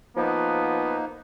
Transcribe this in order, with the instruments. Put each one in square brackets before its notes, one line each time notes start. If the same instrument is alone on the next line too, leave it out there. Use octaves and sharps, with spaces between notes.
[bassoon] F3 [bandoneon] A#3 D#4 [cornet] B3